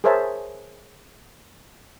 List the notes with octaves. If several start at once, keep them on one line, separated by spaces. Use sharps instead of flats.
G#4 A#4 C5 C#5 E5 A5